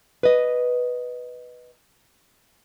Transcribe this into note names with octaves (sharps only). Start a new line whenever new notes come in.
B4 D#5